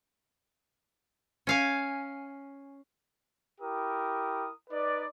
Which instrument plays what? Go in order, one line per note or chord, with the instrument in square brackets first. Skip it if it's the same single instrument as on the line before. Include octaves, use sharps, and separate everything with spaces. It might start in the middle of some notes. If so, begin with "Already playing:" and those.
[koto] C#4 F5 G#5
[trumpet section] E4 G4 A#4 D#6
D#4 B4 D5